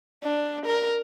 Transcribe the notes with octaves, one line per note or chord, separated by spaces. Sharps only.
D4
A#4